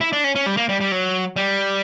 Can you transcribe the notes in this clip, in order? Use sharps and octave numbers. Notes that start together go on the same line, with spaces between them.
E4
D4
C#4
C#4
G3
A#3
G3
G3
F#3
G3